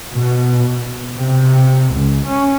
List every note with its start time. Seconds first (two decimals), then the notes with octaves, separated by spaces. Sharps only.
0.14 B2
1.15 C3
1.92 C#2
2.26 C#4